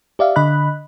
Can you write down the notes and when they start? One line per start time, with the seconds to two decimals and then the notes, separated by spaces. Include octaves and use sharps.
0.19 G4 D5 E5 F5
0.36 D3 D#5 B5 F#6